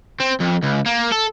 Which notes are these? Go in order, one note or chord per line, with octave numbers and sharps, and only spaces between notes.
C4
F2
C#2
A#3
A4